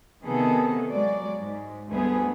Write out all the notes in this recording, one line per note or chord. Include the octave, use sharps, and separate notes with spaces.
C3 D#3 B3 G#4 A4
F#3 G#3 D5
G#2
D2 G3 A3 B3 G#4